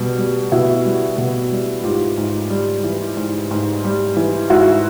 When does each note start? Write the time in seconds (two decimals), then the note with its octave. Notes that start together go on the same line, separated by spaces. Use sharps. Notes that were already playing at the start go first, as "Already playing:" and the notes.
Already playing: B2 G3
0.18 G3
0.52 B2 E4 F#4
0.85 G3
1.18 B2
1.52 G3
1.84 G#2 F4 G4
2.18 G#2
2.50 G3
2.84 E3
3.17 G#2
3.51 G#2
3.85 G3
4.17 E3
4.50 G#2 E4 F#4